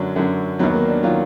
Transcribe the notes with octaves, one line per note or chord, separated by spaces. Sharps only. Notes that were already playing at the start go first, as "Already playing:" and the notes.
Already playing: F#2 D3 F#3 D4
F#2 D3 F#3
D#2 D#3 F#3 B3
A#3
D4
D#3 F#3 F4